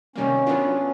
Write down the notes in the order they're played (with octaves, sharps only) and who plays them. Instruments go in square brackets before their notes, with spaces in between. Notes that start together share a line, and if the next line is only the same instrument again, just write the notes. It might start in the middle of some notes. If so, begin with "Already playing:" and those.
[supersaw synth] C3 D#3 G3 A#3 [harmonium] C#4
[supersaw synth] F#3 B3 D4 F4